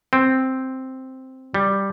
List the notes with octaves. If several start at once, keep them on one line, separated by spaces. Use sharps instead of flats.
C4
G3